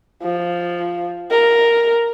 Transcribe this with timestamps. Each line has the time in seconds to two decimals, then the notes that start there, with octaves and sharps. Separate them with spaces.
0.23 F3
1.31 A#4